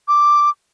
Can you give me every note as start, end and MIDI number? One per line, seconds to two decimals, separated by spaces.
0.08 0.50 86